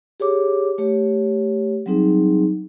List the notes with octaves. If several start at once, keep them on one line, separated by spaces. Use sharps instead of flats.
G4 G#4 C#5 D6
A3 G4 C#5
F#3 G3 C4 D#4 G#4